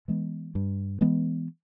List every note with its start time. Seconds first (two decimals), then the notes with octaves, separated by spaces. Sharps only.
0.08 E3 G#3 B3
0.55 G2
1.01 E3 G#3 B3